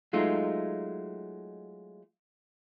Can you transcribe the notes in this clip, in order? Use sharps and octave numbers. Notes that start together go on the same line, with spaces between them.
F#3 G#3 A3 D#4 F4